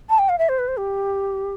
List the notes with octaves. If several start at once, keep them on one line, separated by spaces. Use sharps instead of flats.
A5
G5
F5
E5
C5
B4
C5
G4